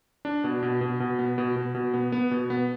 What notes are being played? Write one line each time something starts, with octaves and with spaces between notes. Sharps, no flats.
D4
B2
B2
B2
B2
B3
B2
B2
B2
B3
B3
B2
B3